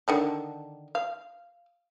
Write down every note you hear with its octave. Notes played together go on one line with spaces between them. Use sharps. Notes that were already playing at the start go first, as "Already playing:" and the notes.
D3 D#3 D4
F5